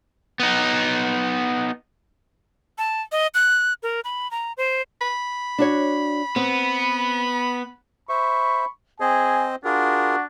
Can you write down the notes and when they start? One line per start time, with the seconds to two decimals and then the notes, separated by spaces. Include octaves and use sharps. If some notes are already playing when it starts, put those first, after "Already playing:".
0.40 B3 D#4
2.78 A5
3.12 D#5
3.34 F#6
3.83 A#4
4.04 B5
4.31 A#5
4.57 C5
5.01 B5
5.58 D4 F#4 C#5
6.36 B3 C4
8.09 C5 E5 B5 C#6
9.00 C4 G#4 C5 D#5 G#5
9.65 D4 F4 F#4 G#4 A#4